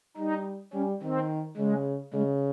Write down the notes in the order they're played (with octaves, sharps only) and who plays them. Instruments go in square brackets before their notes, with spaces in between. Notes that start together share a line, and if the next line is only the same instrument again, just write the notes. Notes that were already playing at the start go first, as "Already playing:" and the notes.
[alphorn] G3 [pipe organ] D#4
[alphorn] G3 [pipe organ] C#4
[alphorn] D#3 [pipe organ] C4
[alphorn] C#3 [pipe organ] G#3
[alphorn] C#3 [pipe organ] G#3